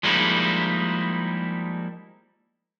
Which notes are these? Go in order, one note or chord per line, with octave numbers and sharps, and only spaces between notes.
F3 G3 G#3 A#3 D#4 E4